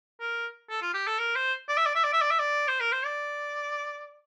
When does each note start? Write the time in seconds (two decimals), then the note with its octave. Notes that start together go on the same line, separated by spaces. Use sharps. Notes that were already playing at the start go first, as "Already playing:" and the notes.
0.20 A#4
0.70 A4
0.82 F4
0.94 G4
1.07 A4
1.19 A#4
1.36 C5
1.69 D5
1.78 E5
1.86 D5
1.95 E5
2.04 D5
2.13 E5
2.21 D5
2.31 E5
2.40 D5
2.68 C5
2.80 A#4
2.92 C5
3.05 D5